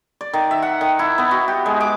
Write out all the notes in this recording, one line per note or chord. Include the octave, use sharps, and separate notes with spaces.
D5
D#3
E5
F#5
D#3
E4
B3
F#4
G4
G#3
D6